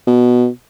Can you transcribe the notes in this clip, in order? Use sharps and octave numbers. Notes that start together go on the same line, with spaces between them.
B2